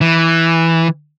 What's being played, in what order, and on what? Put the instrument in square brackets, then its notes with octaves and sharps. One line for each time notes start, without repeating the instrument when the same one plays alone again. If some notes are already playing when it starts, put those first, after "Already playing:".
[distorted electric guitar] E3